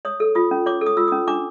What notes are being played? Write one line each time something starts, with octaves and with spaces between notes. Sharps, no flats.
C#5 D#6
A4
F4 D#6
C#4
C#5 D6
A4
D#6
F4 E6
D#6
C#4
D4 D6